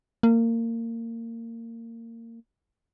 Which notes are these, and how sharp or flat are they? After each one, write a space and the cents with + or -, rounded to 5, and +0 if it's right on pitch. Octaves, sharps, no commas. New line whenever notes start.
A#3 -25